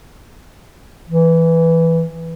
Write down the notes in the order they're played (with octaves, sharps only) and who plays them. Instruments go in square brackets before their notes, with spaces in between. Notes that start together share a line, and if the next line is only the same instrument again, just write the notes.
[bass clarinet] E3